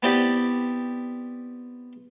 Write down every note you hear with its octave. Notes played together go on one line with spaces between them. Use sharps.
B3 C4 E4 G4 D5